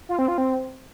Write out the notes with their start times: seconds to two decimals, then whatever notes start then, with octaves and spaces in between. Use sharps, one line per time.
0.09 F4
0.19 C4
0.28 F4
0.38 C4